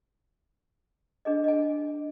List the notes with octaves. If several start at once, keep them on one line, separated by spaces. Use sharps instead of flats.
D4 G#4 D#5
D#5 G#5